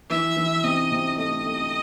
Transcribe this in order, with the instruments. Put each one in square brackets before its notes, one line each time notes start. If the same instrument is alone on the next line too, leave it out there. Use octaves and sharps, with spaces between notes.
[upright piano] E3 [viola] E5
[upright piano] E3
[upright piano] C3 [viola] D#5
[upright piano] C3
[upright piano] A3 [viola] D#5
[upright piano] A3